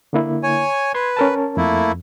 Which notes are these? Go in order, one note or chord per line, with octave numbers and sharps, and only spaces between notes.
D3 A#3 E4
C#5 G#5
B4 C6 G#6
C#4 A#4 A5
F2 A3 A#3 E4